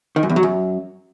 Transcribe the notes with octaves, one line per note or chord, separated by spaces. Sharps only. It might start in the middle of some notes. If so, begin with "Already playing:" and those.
D#3
F#2
E2
F#3
F#2